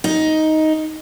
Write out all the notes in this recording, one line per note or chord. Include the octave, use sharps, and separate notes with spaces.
D#4